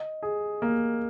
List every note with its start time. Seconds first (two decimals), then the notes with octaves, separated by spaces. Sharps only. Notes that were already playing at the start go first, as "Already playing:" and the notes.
Already playing: D#5
0.23 G#4
0.62 A#3